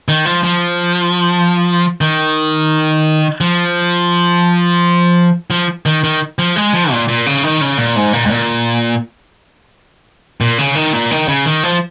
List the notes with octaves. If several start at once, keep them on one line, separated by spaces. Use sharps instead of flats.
D#3
F3
F3
D#3
F3
F3
D#3
D#3
F3
G#3
F3
A#2
A#2
C#3
D#3
C#3
A#2
G#2
A#2
G#2
A#2
A#2
C#3
D#3
A#2
D#3
C#3
D#3
F3